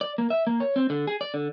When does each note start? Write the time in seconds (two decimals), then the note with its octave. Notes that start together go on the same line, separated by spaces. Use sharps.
0.01 D5
0.18 A#3
0.30 E5
0.47 A#3
0.60 C#5
0.76 C4
0.90 D3
1.07 G#4
1.21 D5
1.34 D3